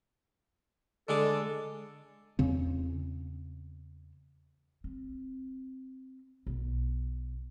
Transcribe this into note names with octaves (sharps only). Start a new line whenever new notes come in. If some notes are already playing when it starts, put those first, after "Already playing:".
D3 G#3 A4 D6
E2 C#3 C4
C4
B1